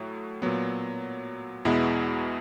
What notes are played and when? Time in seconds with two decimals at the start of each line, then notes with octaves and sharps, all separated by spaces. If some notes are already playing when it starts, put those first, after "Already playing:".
Already playing: A2 F#3 A3
0.42 A#2 F#3 B3
1.65 E2 B2 G#3 B3 E4